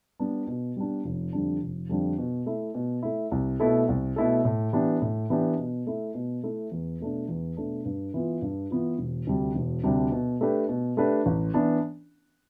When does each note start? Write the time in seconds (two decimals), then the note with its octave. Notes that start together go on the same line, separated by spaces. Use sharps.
0.19 G3 B3 D4
0.48 B2
0.77 G3 B3 D4
1.04 F1
1.33 F2 D3 G3 D4
1.62 F1
1.89 F2 D3 G3 D4
2.18 B2
2.46 A3 E4
2.75 B2
3.03 A3 E4
3.32 C2
3.60 B2 A3 E4 A4
3.89 C2
4.16 B2 A3 E4 A4
4.45 A2
4.73 E3 B3 D4 G4
5.02 A2
5.30 E3 B3 D4 G4
5.59 B2
5.87 A3 E4
6.15 B2
6.44 A3 E4
6.72 E2
7.00 B2 A3 D4
7.28 E2
7.57 B2 A3 D4
7.85 G2
8.14 E3 B3 F4
8.42 G2
8.71 E3 B3 F4
8.99 E1
9.27 D2 C3 G3 D4
9.55 E1
9.84 D2 C3 G3 D4
10.12 B2
10.41 A3 D4 G4 B4
10.69 B2
10.97 A3 D4 G4 B4
11.26 A1
11.54 E3 B3 D4